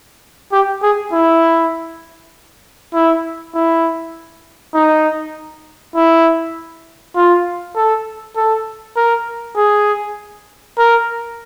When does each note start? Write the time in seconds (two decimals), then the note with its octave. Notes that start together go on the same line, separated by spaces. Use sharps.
0.52 G4
0.82 G#4
1.12 E4
2.93 E4
3.54 E4
4.74 D#4
5.95 E4
7.16 F4
7.76 A4
8.36 A4
8.96 A#4
9.56 G#4
10.78 A#4